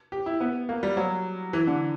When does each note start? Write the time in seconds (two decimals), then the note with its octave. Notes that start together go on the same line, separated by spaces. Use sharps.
0.12 G4
0.26 E4
0.40 B3
0.69 A#3
0.83 G3
0.97 F#3
1.53 E3
1.67 D3